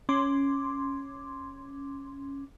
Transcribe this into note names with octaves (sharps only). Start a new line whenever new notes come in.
C#4 C6 D6